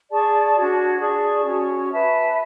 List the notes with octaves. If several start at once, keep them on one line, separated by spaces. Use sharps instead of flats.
G#4 D5 A5 C#6
D4 F#4 C#5
G#4 D5 A5 C#6
C#4 F#4 C#5
B4 E5 A5